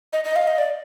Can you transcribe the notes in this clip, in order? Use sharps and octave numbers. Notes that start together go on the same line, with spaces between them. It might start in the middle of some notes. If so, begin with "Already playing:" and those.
D#5
D#5
F5
D#5
D5